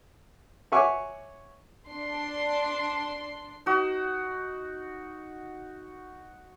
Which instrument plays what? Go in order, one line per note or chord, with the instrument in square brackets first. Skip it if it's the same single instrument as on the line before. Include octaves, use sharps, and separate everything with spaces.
[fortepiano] C#5 E5 F#5 G#5 C#6 D6
[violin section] D4 C6
[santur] D#4 F#4